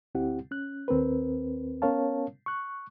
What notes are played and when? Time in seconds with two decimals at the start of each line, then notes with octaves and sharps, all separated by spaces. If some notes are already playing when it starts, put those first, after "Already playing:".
0.15 D2 C4 E4 G4 F#5
0.51 C#4 F#6
0.88 D#2 C4 A#4 B4
1.82 B3 C#4 A#4 C#5 F5 A5
2.46 C#6 F#6